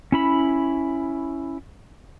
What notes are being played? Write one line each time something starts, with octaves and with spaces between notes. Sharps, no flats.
C#4 E4 B5